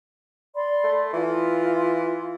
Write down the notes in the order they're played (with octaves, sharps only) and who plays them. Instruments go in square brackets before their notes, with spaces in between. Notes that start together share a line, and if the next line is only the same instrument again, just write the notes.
[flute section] D5 B5 C6
[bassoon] A3
[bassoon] E3 [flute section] F4